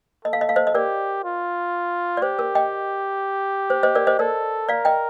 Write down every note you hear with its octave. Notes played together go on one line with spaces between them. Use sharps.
A4 D#5
F5
D#5
F5
C5 D#5
D#5
G4 A#4 D5
F4
D5
G4 C5
A#4
D#5 G5
C5
C5 D#5
A#4 D5
C5 D#5
A4 A#4 D5
A#4 D5 F5
D#5 G5